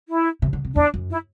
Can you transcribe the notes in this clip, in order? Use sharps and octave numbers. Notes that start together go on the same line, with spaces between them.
E4
C3
D3
C3
E2 D4
F#2
E4